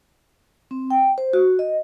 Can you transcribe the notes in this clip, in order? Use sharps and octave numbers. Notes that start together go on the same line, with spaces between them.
C4
G5
C5
F#4
D#5